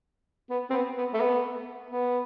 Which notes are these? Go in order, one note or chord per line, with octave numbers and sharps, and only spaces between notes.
B3
C4
B3
B3
A3
B3
B3